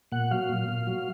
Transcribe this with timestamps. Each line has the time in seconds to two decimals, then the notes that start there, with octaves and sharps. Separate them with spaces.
0.12 A#2 F#5
0.31 F#3 F5
0.49 A#2
0.69 A#2
0.87 F#3